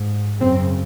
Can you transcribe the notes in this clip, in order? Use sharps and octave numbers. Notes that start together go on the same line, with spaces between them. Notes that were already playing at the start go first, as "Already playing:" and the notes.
Already playing: G#2
F#2 C#3 C4